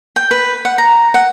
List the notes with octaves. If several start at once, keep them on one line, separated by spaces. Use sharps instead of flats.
G5
B4
F#5
A#5
F#5